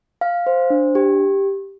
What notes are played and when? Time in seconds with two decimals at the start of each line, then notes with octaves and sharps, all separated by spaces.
0.21 F5
0.46 C5
0.70 D4
0.95 G4